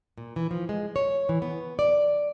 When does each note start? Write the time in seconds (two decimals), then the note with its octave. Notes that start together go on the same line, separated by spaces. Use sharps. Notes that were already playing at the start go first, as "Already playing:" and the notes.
0.18 A#2
0.36 E3
0.51 F3
0.69 G#3
0.96 C#5
1.29 E3
1.42 B3
1.79 D5